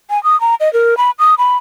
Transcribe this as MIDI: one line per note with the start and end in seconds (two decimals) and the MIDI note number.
0.10 0.22 80
0.24 0.39 87
0.41 0.55 82
0.60 0.72 75
0.73 0.97 70
0.97 1.11 83
1.19 1.35 87
1.38 1.57 83